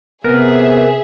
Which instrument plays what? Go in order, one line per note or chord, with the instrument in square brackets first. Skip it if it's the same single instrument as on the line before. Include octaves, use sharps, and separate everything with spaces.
[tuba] C3 [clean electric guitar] B3 [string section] G#4 E5 [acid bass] A#4